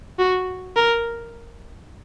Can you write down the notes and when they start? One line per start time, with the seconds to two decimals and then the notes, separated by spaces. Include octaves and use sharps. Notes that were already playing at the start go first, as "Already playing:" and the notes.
0.19 F#4
0.76 A#4